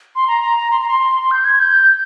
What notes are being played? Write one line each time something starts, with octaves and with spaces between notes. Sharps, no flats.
C6
A#5
A#5
A#5
C6
A#5
C6
G6
G#6
G6